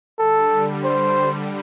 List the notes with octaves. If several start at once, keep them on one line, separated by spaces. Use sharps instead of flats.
D3 G3 A4
C5